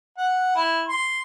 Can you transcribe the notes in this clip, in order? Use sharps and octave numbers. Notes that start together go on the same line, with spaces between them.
F#5
E4
C6